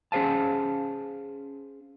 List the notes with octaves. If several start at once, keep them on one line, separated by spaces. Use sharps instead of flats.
C#4 G#4 C5 F5 A5